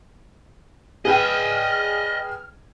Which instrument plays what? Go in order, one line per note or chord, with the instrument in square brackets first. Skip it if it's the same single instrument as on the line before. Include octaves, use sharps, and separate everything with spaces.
[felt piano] G#4 B4 G5 [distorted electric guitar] D#5 E5 [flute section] F6